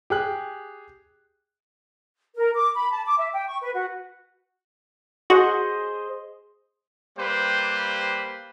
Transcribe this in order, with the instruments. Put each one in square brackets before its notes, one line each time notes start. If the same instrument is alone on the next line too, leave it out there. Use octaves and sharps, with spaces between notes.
[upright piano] G4 G#4 F#6
[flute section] A#4
D6
B5
A5
D6
E5
G5
C#6
B4
F#4
[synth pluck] F#4 [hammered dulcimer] G#4 C5 D#5
[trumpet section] G3 A#3 G4 B4 C5